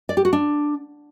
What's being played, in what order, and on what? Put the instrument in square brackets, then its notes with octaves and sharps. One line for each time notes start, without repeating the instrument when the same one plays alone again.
[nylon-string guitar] D5
G4
F#4
D4